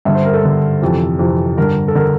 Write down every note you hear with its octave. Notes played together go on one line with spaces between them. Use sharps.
G2 D3 E5
C5
A#4
A4
G2 D3
F2 C3 E3
F2 C3 E3
G2 D3 A#4
A4
D3 A#4